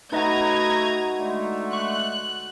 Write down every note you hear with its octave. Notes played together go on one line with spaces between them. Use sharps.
A3 D#4 F#4 B4 D#5 A#5 D#6 G#6
D3 G#3 A3
C#6 F#6